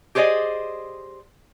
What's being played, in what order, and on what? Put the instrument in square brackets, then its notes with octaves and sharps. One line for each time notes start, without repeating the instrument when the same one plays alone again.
[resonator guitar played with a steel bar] G4 G#4 C5 D5 D#5